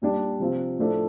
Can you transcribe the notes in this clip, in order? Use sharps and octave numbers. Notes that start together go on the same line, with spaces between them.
A#2 G3 D4
C3 F3 C4 F4
A2 F3 A3 D4 A4